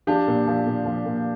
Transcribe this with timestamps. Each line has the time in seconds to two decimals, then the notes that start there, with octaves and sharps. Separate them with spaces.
0.07 F3 D4 G4
0.27 A#2
0.47 F3
0.66 A#2
0.85 F3
1.05 A#2